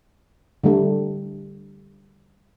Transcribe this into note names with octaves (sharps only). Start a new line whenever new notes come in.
D3 G3 A3